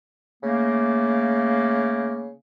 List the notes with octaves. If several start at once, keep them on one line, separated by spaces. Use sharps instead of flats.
C#3 A3 A#3